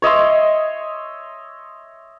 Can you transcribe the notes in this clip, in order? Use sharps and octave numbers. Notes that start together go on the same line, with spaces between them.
C#5 D#5 E5 C6